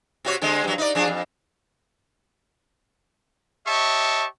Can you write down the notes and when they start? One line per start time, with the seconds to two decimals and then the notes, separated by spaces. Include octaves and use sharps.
0.25 C3 F#4 C#5
0.42 D3 G#3 C4
0.64 G2 F#3
0.78 D#4 D5
0.95 F3 D4 G#4
1.08 F2
3.66 G4 C#5 D#5 E5 A5 C#6